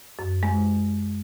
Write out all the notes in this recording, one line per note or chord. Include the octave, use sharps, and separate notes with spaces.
F#2
G#3